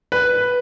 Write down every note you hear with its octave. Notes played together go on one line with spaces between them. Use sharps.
B4